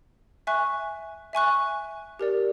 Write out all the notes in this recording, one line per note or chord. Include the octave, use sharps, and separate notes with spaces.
E5 G#5 C#6 F#6
E5 G#5 C#6 F#6
G4 A#4 D5